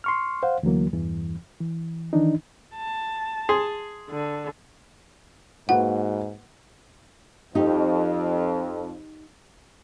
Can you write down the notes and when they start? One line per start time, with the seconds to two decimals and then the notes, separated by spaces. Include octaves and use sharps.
0.04 C6 C#6 F6
0.43 C5 F5 F#5
0.63 D2 E3 F#3 A#3
0.93 E2 G2 E3
1.60 E3
2.13 D#3 E3 D4 D#4
2.76 A5
3.49 G#4 C6
4.10 D3
5.69 G#2 A#3 F#4 B4 F#5
7.55 F2 D#4 G4